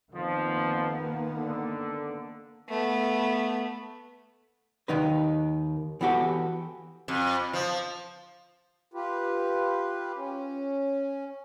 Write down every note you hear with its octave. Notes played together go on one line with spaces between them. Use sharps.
F2 D#3 F3 A#3 B3
D3
A3 B3
D#2 D#3 D#4 B4
E3 B3 F#4 G4 A4
F2
F3
F4 G4 B4
C#4